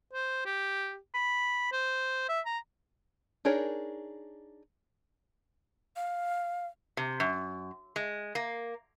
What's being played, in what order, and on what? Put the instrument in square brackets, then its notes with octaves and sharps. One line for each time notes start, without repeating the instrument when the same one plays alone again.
[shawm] C5
G4
B5
C5
E5
A#5
[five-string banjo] D4 D#4 G#4 A#4 C#5
[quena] F5
[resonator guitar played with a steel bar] C3
F#2
G#3
A#3